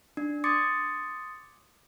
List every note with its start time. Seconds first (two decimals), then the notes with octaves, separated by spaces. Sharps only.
0.17 D4
0.44 C6 D6 D#6 G#6 A6 C#7